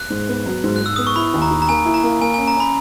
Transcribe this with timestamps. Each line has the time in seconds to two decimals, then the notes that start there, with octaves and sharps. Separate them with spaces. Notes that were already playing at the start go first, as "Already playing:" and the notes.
Already playing: F#6
0.10 G#2
0.29 B3
0.46 F#3
0.64 G#2
0.76 F#6
0.81 G#2 E6
0.96 B3 D#6
1.07 C#6
1.16 E4 B5
1.34 D#2
1.42 A#5
1.50 D#3
1.62 A#5
1.69 A#3 G#5
1.85 E4
1.94 A#5
2.03 A#3
2.21 A#3 G#5
2.34 C#4 G#5
2.48 A#5
2.56 C#4 B5